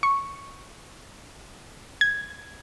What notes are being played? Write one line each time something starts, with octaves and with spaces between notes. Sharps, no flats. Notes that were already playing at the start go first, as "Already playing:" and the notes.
C#6
G#6